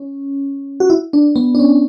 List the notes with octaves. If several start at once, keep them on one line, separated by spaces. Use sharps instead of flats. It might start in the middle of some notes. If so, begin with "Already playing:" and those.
Already playing: C#4
F#4
E4
D4
B3
D4
C#4